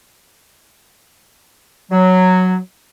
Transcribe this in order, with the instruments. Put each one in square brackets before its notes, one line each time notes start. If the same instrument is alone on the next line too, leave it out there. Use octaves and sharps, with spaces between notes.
[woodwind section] F#3